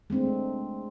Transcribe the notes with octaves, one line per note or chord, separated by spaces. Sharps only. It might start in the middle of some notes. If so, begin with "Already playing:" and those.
G#3 A3 C4 D4